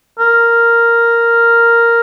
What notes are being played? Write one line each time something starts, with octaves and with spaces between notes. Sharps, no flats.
A#4